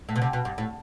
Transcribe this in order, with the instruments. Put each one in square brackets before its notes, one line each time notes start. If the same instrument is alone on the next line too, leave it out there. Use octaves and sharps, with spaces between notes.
[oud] A2
B2
C3
B2
G2
A2